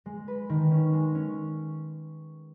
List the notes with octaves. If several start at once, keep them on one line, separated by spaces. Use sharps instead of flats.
G#3
B4
D#3
C#4
G#3
C#4